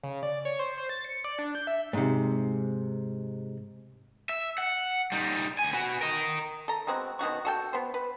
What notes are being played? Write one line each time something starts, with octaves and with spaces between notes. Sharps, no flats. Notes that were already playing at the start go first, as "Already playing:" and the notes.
C#3
D5
C#5
C5
C5
A6
C#7
D5
D4
G6
E5
G#2 C3
E5
F#5
G3 D#4
D2 G#5
B3 F#4
A#4 D#5
A4 A#5
G#3 B3 C4 F#4
B2 D#3 F#4 C#6
F#4 A4 G5
B3 C5
B4